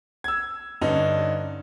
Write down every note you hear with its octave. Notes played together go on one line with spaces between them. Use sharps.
E6 G#6
G2 D3 C#4 D#4